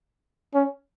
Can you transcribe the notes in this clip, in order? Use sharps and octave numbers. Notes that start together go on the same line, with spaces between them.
C#4